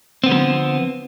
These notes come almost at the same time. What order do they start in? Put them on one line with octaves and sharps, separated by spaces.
C4 B3 D3 G3 F3